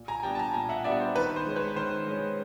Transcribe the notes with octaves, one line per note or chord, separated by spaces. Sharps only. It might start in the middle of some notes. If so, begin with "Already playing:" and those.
Already playing: A#2
G#5 A#5
G#5
G3 B3 D4 G5 A5
A5
G#5 A#5
A#2 G#5 A#5
E5 F#5
G3 B3 D4 D5 E5
C5
D#3 B4
C5
G#3 C#4
B4 C#5
D#3 C5
G#3 C#4